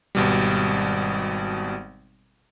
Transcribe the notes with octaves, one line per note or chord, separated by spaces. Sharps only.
G#1 B2 G3